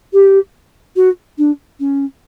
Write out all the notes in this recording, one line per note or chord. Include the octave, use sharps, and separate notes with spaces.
G4
F#4
D4
C#4